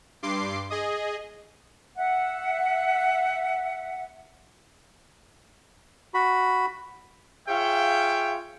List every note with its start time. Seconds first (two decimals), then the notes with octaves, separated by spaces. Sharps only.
0.23 G2 C6 D6 C7
0.70 G#4 D#5
1.96 E5 F#5
6.14 F#4 B5
7.48 F4 G#4 C#5 E5 F5 G5